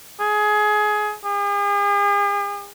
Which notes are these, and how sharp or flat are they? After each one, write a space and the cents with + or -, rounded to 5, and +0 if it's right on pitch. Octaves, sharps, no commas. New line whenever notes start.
G#4 +20
G#4 -45